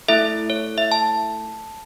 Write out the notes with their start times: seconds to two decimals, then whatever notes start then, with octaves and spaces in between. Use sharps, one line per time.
0.08 A3 E4 A4 E5
0.50 C#5
0.78 E5
0.91 A5